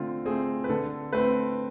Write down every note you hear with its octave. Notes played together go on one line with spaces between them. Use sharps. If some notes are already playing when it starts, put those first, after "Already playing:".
Already playing: D3 A3 C4 F4
A3 C4 G#4
B4
D3 A4
A3 C4 B4